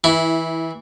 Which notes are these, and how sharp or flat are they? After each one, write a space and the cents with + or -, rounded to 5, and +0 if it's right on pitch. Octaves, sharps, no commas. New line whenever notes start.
E3 -20 E4 +0